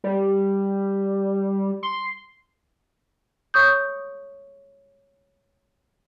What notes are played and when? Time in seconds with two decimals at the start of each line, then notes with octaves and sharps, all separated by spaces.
0.04 G3
1.83 C6
3.54 C#5 C#6 D#6 G6